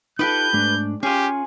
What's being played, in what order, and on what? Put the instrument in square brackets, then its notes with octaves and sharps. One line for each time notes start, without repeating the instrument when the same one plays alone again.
[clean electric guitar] D#4 F4 A4 [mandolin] G4 B4 [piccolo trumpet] G6
[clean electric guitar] G#2 A3 D4
[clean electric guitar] C#4 [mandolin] F4 G#4 [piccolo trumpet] G4